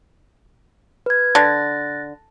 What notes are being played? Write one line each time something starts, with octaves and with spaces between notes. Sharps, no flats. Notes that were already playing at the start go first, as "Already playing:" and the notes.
B4 G#6
D3 F#6 A6 A#6